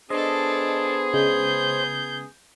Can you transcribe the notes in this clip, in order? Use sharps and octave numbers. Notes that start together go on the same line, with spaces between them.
B3 D4 G#4 A4 C5 D#5
C#3 G#3 G6